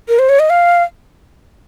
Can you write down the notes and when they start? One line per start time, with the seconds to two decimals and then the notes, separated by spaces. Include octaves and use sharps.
0.08 A#4
0.19 C5
0.29 C#5
0.39 D#5
0.50 F5